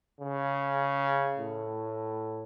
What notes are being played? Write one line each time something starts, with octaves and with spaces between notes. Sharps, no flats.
C#3
A2